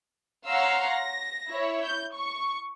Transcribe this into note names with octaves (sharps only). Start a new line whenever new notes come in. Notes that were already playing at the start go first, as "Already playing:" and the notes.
C#5 F5 F#5 A#5 C6 E6
A#6
E4 C#5
G6
C#6